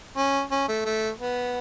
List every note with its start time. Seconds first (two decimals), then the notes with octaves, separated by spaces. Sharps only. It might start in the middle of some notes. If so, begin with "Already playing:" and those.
0.17 C#4
0.51 C#4
0.69 A3
0.86 A3
1.20 B3